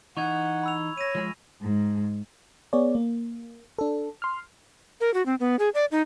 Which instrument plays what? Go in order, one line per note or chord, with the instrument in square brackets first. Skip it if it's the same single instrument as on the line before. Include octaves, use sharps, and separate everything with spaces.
[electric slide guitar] E3 D#4 [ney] F#5 [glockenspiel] C#6 G#6
[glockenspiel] B5 E6 F7
[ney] C#5 [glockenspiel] A#6 D#7
[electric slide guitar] F3 G#3 G#4
[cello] G#2
[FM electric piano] B3 G#4 C#5 D5
A#3
D4 A4
C6 F6
[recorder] A#4
F#4
C4
B3
G#4
D5
D#4